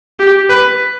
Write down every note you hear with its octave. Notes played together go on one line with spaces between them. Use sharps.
G4
B4